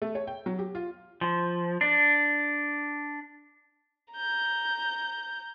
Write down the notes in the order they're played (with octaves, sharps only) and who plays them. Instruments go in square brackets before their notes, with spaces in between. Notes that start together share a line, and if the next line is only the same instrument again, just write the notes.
[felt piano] A3
C#5
G5
F#3
G4
F4
[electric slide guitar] F3
D4
[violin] A#5 G6